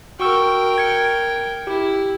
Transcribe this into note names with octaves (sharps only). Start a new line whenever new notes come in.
F#4 A#4 G5 C#6 E6
G#6 C#7
E4 G4